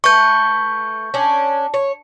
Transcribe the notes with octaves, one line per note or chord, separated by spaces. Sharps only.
A3 B4 C#6 G6
C#4 D4
C#5